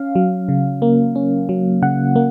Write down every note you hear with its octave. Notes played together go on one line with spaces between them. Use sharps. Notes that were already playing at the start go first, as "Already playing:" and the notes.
Already playing: C#4 F5
F#3
C#3
A#3
C#4
F#3
C#3 F#5
A#3